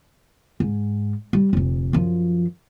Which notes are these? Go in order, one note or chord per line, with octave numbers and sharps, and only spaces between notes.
G#2
G3
F1 D2
F#2 F3